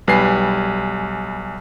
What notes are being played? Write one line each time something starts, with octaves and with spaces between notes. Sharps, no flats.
B1 G3 B4 G#5 C7